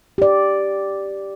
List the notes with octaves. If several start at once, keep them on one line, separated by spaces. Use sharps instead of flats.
G4 D5